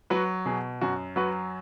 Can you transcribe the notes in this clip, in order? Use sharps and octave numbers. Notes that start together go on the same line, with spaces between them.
F#3 F#4 B4
B2 G#4
F#2 F#4
F#3 F#4 B4